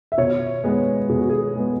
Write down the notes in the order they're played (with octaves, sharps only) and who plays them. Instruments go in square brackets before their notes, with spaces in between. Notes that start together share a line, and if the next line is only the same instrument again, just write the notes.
[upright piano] E5
B2 C#5
G#3 B3 B4
B2 G#4
F#4
G#4
G#3 B3